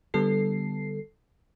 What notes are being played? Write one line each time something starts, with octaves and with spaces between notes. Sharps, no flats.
D3 G3 B3 A4 C7